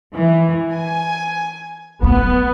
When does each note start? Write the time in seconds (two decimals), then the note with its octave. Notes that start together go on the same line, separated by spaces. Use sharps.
0.14 E3
0.73 G#5
2.02 F#3 A3 B3